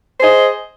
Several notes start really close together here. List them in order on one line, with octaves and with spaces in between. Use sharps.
C5 G#4 D#5